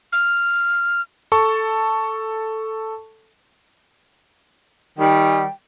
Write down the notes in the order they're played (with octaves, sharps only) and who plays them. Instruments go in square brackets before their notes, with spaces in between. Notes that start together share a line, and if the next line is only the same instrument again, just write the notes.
[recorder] F6
[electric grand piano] A4 A5 C#6
[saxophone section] D#3 G3 [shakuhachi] G5